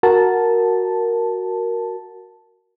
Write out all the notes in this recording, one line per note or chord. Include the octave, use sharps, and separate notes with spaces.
F#4 A#4 A5